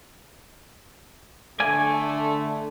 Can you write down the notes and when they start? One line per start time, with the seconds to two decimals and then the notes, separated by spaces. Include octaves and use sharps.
1.60 D3 A3 D5 G#5